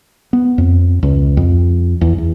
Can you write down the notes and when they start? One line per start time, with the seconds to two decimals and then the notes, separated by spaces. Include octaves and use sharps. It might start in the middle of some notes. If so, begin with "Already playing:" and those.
0.33 B3
0.58 F2
1.03 C#2
1.37 F2
2.01 E2
2.18 E2